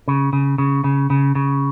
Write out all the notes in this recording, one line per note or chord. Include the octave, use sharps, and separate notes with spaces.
C#3
C#3
C#3
C#3
C#3
C#3